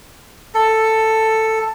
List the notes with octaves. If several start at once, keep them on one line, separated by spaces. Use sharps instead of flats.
A4